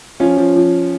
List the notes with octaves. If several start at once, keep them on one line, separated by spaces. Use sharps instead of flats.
F3 C#4 F4
F3
F3